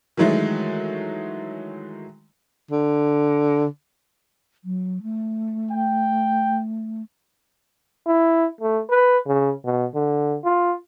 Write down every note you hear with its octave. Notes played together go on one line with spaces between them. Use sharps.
D#3 E3 F#3 G#3 A3
D3
F#3
A3
G5
E4
A3
B4
C#3
B2
D3
F4